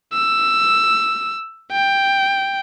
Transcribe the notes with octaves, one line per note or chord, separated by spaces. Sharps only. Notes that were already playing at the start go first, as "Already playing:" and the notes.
E6
G5